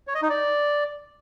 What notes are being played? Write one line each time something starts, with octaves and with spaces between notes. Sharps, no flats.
C#5
D#5
D#4
D5